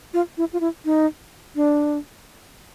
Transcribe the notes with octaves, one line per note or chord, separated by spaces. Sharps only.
F4
E4
F4
E4
D#4
D4